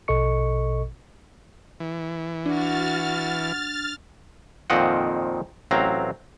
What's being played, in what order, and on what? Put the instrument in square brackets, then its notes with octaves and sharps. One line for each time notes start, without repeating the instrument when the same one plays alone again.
[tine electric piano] A#1 B2 A4 D#5 C#6 C#7
[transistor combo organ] E3
[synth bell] D4 [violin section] F#4 [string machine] F6 A6
[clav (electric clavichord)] F2 A#2 D#3 C4 D#5 F#5
A1 F#3 C4 F5 A#5